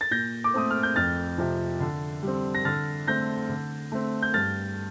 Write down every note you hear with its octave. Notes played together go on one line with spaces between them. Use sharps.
A6
A#2 G6 A#6
D6
A3 C4 D#6
F6
G6
F2 F6 A6
C3 F3
D3
G3 C4
A#6
D3 F6 A6
A3 C4 G6 A#6
D3
A3 C4
G6
G2 F6 A6